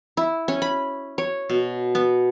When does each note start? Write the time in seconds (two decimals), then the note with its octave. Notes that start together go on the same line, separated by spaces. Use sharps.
0.17 E4
0.48 C#4
0.62 B5
1.18 C#5
1.49 B2
1.95 B3